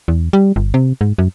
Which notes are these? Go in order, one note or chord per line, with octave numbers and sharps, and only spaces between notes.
E2
G3
G1
C3
G#2
F#2